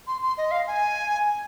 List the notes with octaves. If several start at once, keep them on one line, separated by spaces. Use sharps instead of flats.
C6
C6
D#5
F5
G#5